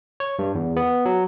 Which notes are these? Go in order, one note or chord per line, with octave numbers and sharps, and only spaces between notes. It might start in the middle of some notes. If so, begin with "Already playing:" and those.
C#5
G2
E2
B3
F#3